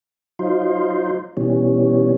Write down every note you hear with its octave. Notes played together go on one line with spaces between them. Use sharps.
F#3 D#4 F4 C5
B2 E3 G3 C#4